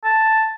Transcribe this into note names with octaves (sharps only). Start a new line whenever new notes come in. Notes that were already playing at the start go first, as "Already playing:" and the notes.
A5